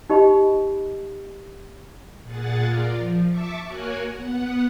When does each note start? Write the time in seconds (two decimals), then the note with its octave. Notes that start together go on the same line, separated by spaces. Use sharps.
0.10 D#4 G4 D#5 B5
2.23 A#2 G#4 F#5 A6
2.63 F4 A#4 D5
2.97 F3
3.27 E5 A5 C#6 D6
3.66 A#3 F#4 A#4 C#5 F#5 G#5
4.12 B3 F#5